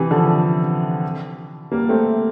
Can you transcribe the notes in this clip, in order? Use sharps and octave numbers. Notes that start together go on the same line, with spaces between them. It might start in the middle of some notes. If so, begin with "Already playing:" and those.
Already playing: C3 E3
D3 F3
G3 A#3
A3 C4